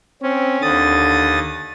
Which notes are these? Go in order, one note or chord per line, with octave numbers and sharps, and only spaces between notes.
C4 C#4
D#2 D3 D#6 A6